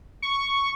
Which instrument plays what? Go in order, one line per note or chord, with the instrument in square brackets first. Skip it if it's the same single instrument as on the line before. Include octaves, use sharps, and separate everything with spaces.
[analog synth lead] C#6